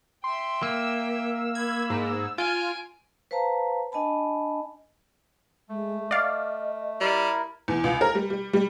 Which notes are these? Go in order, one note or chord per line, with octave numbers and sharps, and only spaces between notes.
E5 G5 C6
A#3 E6
B5 G#6
G#2
F4 G#5 D7
B4 C5 F5 A5 A#5
D4 D#5 G#5 A5 B5
G#3 A3
D5 D#5 F5
G3 E4 A#4
E2
C#2
A#4
G3
G3
G3